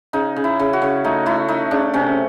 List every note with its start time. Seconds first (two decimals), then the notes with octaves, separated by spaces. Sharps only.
0.13 C#3 D#4
0.36 C#3
0.44 E4
0.59 C#3
0.73 F#4
0.82 C#3
1.04 A3 D#4
1.26 A3 E4
1.48 A3 D#4
1.71 C#3 D4
1.94 C3 C#4